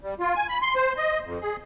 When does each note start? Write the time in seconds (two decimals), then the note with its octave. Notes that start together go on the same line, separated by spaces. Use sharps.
0.01 G3
0.20 F4
0.35 G#5
0.49 B5
0.62 C6
0.76 C5
0.97 D#5
1.24 F2
1.42 G#4